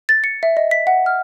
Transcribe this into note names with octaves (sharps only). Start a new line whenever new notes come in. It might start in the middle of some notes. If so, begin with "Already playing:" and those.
A6
C#7
E5
D#5
B6
F#5
F6